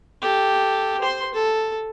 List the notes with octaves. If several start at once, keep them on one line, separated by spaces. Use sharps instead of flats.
G4 A4
C5 C6
A4